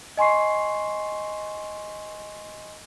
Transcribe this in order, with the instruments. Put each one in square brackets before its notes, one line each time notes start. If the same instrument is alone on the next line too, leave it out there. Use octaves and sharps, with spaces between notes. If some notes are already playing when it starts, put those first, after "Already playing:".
[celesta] D#5 G#5 C6 C#6 C7